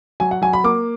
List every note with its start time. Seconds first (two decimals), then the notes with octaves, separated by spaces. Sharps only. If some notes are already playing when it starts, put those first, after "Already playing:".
0.20 F#3 G#5
0.31 F#5
0.42 F#3 G#5
0.53 B5
0.64 A#3 D6